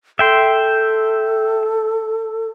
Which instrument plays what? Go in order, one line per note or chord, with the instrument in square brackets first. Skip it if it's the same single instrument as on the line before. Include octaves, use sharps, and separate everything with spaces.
[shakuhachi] A4 [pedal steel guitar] E5 G5 C6